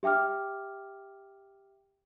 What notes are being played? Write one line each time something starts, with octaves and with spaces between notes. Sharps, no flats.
G4 E5 G5 D6 F6